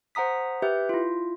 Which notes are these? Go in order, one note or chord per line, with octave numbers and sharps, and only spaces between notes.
C5 F#5 A#5 D#6 B6
G4 B4 E5 G6
E4 F4